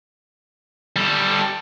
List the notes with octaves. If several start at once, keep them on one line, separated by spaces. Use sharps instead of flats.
G3 A4